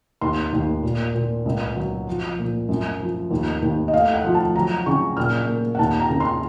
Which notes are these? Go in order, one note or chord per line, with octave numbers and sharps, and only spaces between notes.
D#2 C6
D#2
A#2
A#2
C#2
F#3
F3
A#2
F#2
F3
D#2
D#2
D#5
A3 F5
F#5
F3
A5
F#3 A#5
C#3 C#6
A#2 F6
A#3
F#5
D#2 A5
A#5
C#3
C6